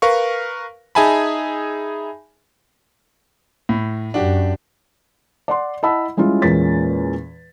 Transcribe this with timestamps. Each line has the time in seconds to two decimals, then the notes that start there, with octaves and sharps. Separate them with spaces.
0.02 A#4 B4 F5 C#6
0.95 D#4 G#4 E5 G#5 A5 B5
3.69 A2
4.14 F#2 D4 F#4 G4
5.48 D5 F#5 C6
5.83 E4 D#5 F#5 A5 B5 E6
6.17 G3 G#3 C#4 E4 F4
6.42 E2 A#2 G#3 C#4 A6 B6